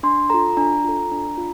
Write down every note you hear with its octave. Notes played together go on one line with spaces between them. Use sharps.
D4 C6
F4 A4 A#5
D4 A#5
F4 A4
D4
F4